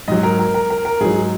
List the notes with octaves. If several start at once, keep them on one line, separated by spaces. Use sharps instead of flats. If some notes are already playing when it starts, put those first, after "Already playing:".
G#2 F#3 D#5
A#4
A#4
A#4
A#4
A#4
G#2 F#3 G#4